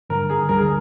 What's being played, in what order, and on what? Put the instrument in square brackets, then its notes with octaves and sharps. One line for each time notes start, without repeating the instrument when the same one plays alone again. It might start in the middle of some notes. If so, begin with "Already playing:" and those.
[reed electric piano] G2 D3 G3 [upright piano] A#4
[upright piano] G#4
[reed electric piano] D2 D3 G3 [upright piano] A#4
[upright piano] G#4